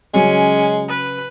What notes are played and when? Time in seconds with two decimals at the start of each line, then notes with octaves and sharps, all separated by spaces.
0.14 C#3 F#3 G#3 C#4
0.88 B4